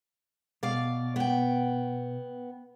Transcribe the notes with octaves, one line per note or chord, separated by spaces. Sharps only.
B2 D5 F5
B3 G5